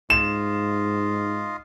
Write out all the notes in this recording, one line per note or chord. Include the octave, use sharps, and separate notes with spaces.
G#2 F4 D#5 F5 E7